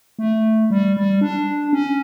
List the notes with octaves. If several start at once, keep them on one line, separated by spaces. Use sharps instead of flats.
A3
G3
G3
D4
C#4